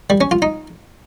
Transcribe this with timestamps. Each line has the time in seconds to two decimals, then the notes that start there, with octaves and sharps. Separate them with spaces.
0.10 G3
0.21 C#4
0.31 F4
0.42 D#4